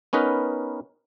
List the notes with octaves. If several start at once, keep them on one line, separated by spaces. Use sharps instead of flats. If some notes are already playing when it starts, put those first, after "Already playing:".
B3 C#4 D#4 A#4 B4